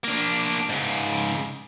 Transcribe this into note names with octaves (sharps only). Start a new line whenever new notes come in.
A#3 D4
G#2 C#3